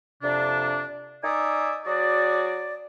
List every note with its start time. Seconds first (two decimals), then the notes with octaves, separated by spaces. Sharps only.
0.22 F2 C3 D4
1.23 D#4 D5 E5 G#5 D#6
1.85 F#3 F#4 G#4 D5